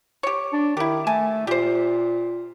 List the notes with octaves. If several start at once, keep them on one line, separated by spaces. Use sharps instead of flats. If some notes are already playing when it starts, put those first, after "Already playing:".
G4 C#5
D4
D#3 E4 G4
A3 G#5 A5
A#2 G4 C5